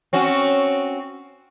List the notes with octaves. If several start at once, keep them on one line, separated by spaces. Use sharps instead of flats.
C4 C#4 F#4